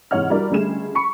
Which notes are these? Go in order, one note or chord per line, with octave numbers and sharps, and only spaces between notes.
G#2 C3 E3 C#5 F#5 F6
G3 D4 E4 F#4 A#4 D5
C#2 D3 G3 A3 G#4 E7
B5 C#6 C#7